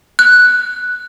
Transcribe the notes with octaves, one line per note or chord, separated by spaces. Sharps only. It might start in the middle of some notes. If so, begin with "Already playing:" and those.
F#6